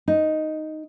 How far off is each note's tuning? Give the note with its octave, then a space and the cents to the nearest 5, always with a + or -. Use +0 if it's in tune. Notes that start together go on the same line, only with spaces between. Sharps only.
D#4 +0